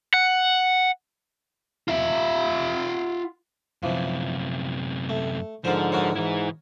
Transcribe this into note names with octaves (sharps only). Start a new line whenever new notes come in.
F#5
F4 E5
F#2 C3 E3 F3
A3
G#2 D3 F3 A#4 C5
F#4 A#4 C#5
G#2 E3 E4